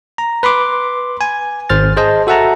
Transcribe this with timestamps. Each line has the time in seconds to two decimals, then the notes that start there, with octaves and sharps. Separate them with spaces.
0.18 A#5
0.43 B4 B5 C6 D6
1.21 G#5
1.69 G#1 C5 F6 A6
1.97 G#4 C5 D#5 A5
2.27 F#4 A4 E5 F#5 A5 A#5